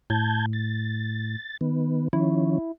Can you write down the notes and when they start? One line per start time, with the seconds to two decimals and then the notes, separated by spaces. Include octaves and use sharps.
0.10 A2 A5 G6 G#6
0.53 A6
1.61 D#3 B3
2.13 D#3 F3 C#4 E4